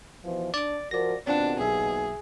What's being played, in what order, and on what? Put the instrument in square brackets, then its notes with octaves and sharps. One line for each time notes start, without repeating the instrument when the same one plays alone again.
[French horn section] B2 E3 F3
[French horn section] D4 [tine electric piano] D5 D6
[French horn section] F3 F#4 A#4 [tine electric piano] D5 A#6
[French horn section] D#2 B2 [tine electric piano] C4 F4 F#5 [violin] D4
[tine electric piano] B1 E5 [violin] G#4